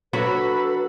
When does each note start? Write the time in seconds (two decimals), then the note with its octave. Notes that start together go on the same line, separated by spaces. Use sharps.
0.13 F#3 D4 F#4 A4 B4 B5